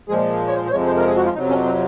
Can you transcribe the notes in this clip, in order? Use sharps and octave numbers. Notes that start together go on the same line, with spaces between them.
A#2 F3 G#3 G#4
C#5
C5
C5
F2 C3 F3 G#3 C#5
C5
A#4
G#4
F#4
F4
F2 C3 F#3 D#4
C#4
C4